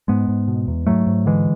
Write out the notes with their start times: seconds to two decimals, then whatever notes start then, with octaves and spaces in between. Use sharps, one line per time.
0.08 G#2 G#3 B3
0.28 G#2
0.48 B2
0.68 E2
0.87 G#2 F#3 A3
1.07 G#2
1.26 D3 E3 G#3